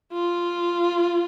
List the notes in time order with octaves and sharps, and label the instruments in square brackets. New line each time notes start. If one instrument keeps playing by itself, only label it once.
[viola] F4